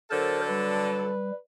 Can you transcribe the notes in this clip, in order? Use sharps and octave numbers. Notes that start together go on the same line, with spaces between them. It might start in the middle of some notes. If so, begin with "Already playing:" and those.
D3 F#3 A4 A#4 C5
G3 B4